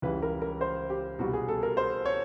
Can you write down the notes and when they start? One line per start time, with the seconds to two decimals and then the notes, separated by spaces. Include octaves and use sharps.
0.02 C#2 C#3 E3 G3 B4
0.22 A#4
0.42 A#4
0.61 C5
0.90 G4
1.19 C2 B2 G3 F#4
1.33 G#4
1.48 A4
1.63 A#4
1.77 C5
2.05 C#5